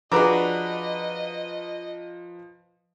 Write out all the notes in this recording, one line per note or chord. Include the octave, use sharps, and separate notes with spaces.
F3 D4 F#4 G#4 B4 D#5 A#5 D6